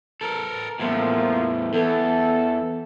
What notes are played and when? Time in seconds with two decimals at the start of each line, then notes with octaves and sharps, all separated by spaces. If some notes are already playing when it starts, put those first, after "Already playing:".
0.21 A4 A#4
0.79 E2 A2 F3 A#3
1.73 E2 A4